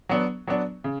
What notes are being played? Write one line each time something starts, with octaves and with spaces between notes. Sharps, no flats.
F#3 B3 D4
F#3 B3 D4
C#3